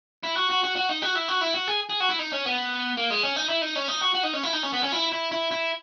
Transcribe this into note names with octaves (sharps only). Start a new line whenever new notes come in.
E4
F#4
F#4
F#4
F#4
D#4
F#4
E4
F#4
E4
F#4
G#4
G#4
F#4
E4
D#4
C#4
B3
A#3
G#3
C#4
D#4
E4
D#4
C#4
D#4
F#4
F#4
D#4
C#4
E4
D#4
C#4
B3
C#4
E4
E4
E4
E4